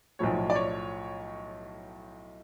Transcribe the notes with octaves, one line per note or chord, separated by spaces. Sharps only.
B1 A2 F3 C#5
D5
C#5